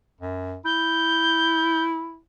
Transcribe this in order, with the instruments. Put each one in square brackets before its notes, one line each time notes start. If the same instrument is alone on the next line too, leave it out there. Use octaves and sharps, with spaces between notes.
[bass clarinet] F#2
[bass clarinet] E4 [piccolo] G6